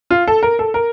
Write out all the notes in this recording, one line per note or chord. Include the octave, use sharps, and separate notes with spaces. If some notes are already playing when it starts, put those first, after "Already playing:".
F4
A4
A#4
A4
A#4